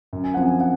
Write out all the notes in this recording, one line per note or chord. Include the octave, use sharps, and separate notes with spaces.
F#2
G#5
F3 C4 F#5
G#5
F#5